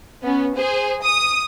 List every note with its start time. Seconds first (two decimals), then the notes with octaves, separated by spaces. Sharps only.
0.23 B3 C#4
0.55 G#4 C5
1.03 D#6